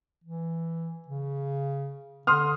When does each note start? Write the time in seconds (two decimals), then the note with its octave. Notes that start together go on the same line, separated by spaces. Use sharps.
0.24 E3
1.08 C#3
2.27 D3 C6 D#6 F6